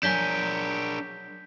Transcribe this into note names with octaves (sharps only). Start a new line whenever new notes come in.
F#3 D4 A#4 G#5 G6 B6 G7